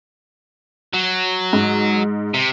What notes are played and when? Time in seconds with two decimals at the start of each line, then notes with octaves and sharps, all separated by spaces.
0.93 F#3
1.53 G#2
2.34 C3